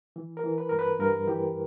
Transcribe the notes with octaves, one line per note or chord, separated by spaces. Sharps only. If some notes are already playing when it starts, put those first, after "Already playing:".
E3
A#4
E3
B4
G2 A#4
B4
G2 A#4
E3 G4